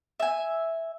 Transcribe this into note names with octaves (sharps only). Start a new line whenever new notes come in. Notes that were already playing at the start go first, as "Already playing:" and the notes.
E5 G#5